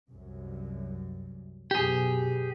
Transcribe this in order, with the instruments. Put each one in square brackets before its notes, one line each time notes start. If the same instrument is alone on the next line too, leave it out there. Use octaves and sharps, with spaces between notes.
[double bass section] C2 F#2
[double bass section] F#2 B2 [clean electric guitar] G4 G#4